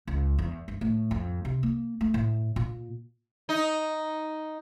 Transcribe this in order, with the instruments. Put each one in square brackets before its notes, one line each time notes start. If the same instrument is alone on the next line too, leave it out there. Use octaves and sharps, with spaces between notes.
[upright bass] C#2
E2
G2
A2
F2
C3
A#3
A3
A2
A#2
[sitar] D#4